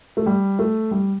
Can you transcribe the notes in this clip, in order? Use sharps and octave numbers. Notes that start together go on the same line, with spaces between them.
A3
G3
A3
G3